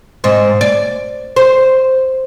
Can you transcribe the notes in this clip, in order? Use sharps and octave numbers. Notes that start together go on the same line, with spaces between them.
G#2 C4
D5
C5